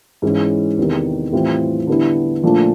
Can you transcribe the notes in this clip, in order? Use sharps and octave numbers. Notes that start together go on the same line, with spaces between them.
G#2 E3 G#3 C#4 E4
E2 C3 D#3
A2 E3 G3 C4 F4
D3 G3 B3 E4
A#2 F3 A3 D4